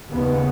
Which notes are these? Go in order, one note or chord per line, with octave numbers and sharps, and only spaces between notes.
D#2 C#3 B3